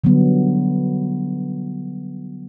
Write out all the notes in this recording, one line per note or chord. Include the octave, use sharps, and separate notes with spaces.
D3 F#3 G3 B3